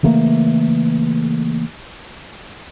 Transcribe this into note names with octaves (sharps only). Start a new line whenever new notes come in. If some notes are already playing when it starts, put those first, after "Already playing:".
C#3 E3 A3 A#3